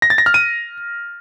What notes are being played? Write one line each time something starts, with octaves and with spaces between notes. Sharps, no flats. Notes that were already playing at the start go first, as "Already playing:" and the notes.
A#6
A6
A#6
F6
D#7